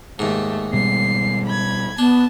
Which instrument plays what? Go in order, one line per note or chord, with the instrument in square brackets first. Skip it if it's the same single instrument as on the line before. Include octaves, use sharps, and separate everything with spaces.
[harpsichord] D#2 G#2 [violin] A3
[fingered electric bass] B2 G3 [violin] C7
[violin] B5 G#6
[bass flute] B3 [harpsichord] D4 [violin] A5